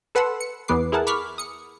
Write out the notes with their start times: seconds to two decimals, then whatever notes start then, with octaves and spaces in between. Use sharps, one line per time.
0.15 A4 B4 F#5 C6 E6
0.40 C#7
0.68 E2 E3 B3 B4 D6 C7
0.92 E4 G#4 A#4 F#5 A5
1.07 B5 C#6 D6 F6 B6 C7
1.38 D#6 C#7